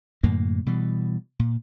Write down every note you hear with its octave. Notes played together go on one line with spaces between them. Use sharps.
F#2 A2 D3 A#3
B2 E3 G3
A#2